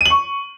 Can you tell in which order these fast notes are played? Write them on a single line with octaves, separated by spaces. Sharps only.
D#7 F#7 C#6